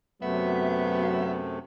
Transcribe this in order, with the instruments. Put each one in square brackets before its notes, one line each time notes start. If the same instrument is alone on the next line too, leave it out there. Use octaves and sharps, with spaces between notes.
[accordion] F#2 C3 A3 [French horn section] F#3 [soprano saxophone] B3 [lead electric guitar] E5